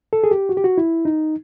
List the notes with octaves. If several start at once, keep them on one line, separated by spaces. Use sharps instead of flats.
A4
G#4
G4
F#4
G4
F#4
E4
D#4